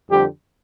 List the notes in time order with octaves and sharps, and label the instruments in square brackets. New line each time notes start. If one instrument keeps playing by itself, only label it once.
[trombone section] F2 D3 G3 C4 G4